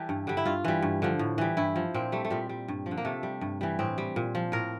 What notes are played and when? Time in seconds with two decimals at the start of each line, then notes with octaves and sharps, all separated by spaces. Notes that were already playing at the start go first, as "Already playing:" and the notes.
Already playing: E3 G3 G4 A4
0.09 G2
0.27 D3 G3
0.37 E4
0.45 G2 F4
0.65 E3 G3
0.82 G2
1.02 D3 F3
1.19 A2
1.38 E3 G3
1.57 G2 E4
1.76 F3
1.94 A#2 C4
2.12 G3 A3
2.25 A3
2.30 A#2 G3
2.49 G3
2.68 G2
2.86 F3
2.91 D3
2.98 A#3
3.05 C3 A3
3.23 G3
3.41 G2
3.61 E3 G3
3.79 A2 C4
3.98 G3
4.16 A#2
4.35 F3
4.52 A2 A#4